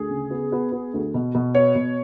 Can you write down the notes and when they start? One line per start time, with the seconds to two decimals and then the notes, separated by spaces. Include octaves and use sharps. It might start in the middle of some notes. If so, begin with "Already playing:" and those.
Already playing: D2 G#4
0.10 C#3
0.30 B3
0.52 B3
0.72 B3
0.94 D2
1.14 B2
1.35 B2
1.55 B3 C#5
1.75 B2